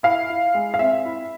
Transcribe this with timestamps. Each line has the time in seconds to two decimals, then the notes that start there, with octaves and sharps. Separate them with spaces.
0.03 E4 F5
0.30 E4
0.54 G#3
0.74 F5
0.79 C4 E5
1.05 E4